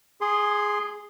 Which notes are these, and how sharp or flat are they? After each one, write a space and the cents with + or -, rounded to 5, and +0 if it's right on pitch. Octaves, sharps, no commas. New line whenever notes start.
G#4 +0 C6 +0 D#6 -35